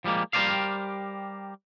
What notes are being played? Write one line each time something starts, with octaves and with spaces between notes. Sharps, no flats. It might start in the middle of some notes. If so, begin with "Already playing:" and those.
F3 G3 G#3 A#3
G3 G4 A#4 C5 D5 F5